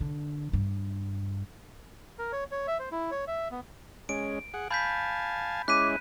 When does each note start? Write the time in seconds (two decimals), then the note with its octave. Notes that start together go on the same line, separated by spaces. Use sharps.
0.01 D3
0.53 G2
2.19 A#4
2.32 C#5
2.52 C#5
2.67 E5
2.79 C5
2.92 E4
3.11 C#5
3.27 E5
3.51 B3
4.09 G#3 C#4 D7
4.54 G#4 F#5
4.71 F5 G#5 A5 B5 G6 B6
5.68 G#3 C#4 E4 D6 F#6 B6 D#7